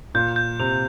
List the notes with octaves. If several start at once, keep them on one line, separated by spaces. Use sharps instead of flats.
A#2 G6
G6
C3 F7